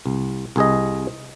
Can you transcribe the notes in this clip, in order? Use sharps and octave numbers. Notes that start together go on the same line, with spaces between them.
C2
C2 G#4 D#5